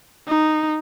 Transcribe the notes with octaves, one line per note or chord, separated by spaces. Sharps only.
D#4